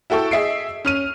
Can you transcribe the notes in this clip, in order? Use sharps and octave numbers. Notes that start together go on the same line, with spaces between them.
E4 F#4 A4 G5 C#6 E6
G#4 D#5 E5 C7 D7
C#4 F6 D#7